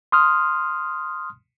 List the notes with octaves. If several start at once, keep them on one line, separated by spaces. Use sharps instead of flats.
C6 D#6 F6